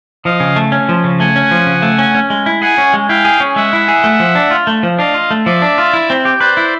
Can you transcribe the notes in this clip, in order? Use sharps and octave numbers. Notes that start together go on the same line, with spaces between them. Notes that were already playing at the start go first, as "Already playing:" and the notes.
F3 D#5 F5
C#3
A3
C#4
F3
C#3
A3 F#5 G#5
C#4
F3
C#3
A3
C#4
C#4
G#3
E4
G#4 F#5 G#5
C#4
G#3
E4 F5 G5
G#4
C#4
G#3 E5 F#5
E4
G#4
A3
F3
D4
F4
A3
F3
D4 D#5 F5
F4
A3
F3 D5 E5
D4
F4
E4
C4
G4
B4 C5 D5
E4